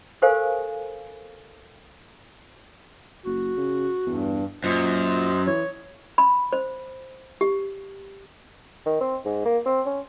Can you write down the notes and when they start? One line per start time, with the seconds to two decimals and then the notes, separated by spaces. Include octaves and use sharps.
0.22 G4 A4 A#4 C5 F5 G#5
3.25 F#1 F#4
3.57 C#3
4.07 E2 G2
4.64 F#2 A#2 F4 C5 D#5
5.47 E3 C#5
6.18 B5
6.53 C5
7.41 G4
8.86 D#3
9.01 C4
9.25 G#2
9.45 A#3
9.66 C4
9.86 C#4